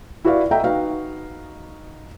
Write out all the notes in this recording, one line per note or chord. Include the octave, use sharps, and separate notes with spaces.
E4 F#4 G4 B4 D5 F5
A4 D#5 E5 F#5 G5 A#5
D#4 F#4 B4 F5